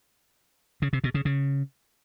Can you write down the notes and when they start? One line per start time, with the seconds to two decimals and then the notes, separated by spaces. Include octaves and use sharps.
0.82 C#3
0.93 C3
1.04 B2
1.14 C#3
1.25 C#3